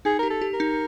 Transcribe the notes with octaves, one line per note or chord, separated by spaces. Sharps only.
D#4 G#4
G4 A#4
A4
G4
A#4
D#4